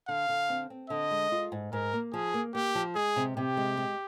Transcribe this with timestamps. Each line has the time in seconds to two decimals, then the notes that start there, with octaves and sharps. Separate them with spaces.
0.08 D3 F5
0.29 D3
0.49 C4
0.70 C4
0.90 D3 D#5
1.11 G#3
1.32 F4
1.52 G#2
1.73 G#2 A#4
1.93 A#3
2.13 F3 G#4
2.34 A#3
2.54 A#3 G4
2.75 F3
2.95 G#3 G#4
3.16 C3
3.37 C3 G4
3.57 G#3
3.77 G#3